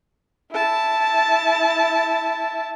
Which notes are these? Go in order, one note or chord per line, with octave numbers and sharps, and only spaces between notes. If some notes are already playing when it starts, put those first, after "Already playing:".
E4 A5